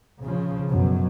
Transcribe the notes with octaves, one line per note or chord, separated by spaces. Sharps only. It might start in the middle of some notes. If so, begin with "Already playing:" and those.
C#3 F3
F#2 B2 F#3